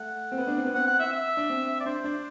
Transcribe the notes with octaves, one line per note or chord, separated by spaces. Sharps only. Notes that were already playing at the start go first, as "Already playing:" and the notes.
Already playing: A3 F#5
C4
B3
D4
C4
B3
C4 F#5
F#5
E5
E5
D4
C4
D5
D4 C5
D4